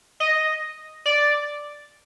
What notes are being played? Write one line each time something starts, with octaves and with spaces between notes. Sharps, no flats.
D#5
D5